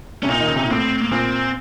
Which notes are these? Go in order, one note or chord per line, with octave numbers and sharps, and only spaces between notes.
C3 C#4
A#2 D#4
D#3
C#3
C3
A#2
A2 C4
A#3
A#2 C4